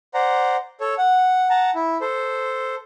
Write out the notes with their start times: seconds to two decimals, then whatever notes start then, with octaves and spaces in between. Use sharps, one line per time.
0.14 C5 D5 F#5 A#5
0.81 A4 C#5
0.98 F#5
1.50 F#5 A5 A#5
1.75 E4
2.01 A4 C5